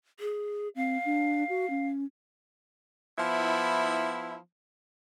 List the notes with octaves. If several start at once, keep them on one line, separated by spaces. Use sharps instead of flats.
G#4
C4 F5
D4
F#4
C#4
F3 B3 E4